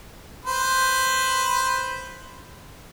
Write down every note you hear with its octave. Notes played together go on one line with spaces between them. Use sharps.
B4 C5